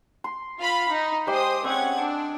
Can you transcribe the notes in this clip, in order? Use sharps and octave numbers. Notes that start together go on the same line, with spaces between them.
C6
F4 F5 B5
D#4
G#3 G4 C5 C6 D#6
G#3 C4 C#4 F#5 G#6
D4